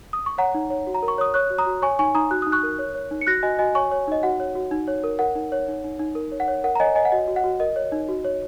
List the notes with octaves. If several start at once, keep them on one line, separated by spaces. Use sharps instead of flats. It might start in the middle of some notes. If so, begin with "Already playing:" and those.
D#6
C#6
C#5 F#5 A#5
D#4
C#5
F#4
A#5
A#4
C#6
C#5 D#6
C#5 C#6 F#6
F#4
A#5 D#6
F#4
C#5 G#5 C#6
D#4 G#5 C#6
D#4 A#5 D#6
F#4 F#6
D#4 D#6
C#6 F#6
A#4
C#5
C#5
D#4
C#7
F#4 F#6 A#6
F#4 D#5 G#5
F#4 D#5 G#5
C#5 G#5 C#6
C#5
D#4 D#5
F#4 F#5
C#5
F#4
D#4
C#5
A#4
A#4 F#5
D#4
C#5
D#4
D#4
D#4
A#4
C#5
F#5
C#5
A#4 F#5
A#5
C#5 D#5 G#5
C#5 D#5 G#5
F#5
F#4 D#5
F#4
F#5
F#4
A#4 D#5
C#5
D#4
F#4
C#5